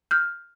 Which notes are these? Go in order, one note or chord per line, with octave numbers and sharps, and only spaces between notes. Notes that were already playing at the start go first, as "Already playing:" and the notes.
F6 G6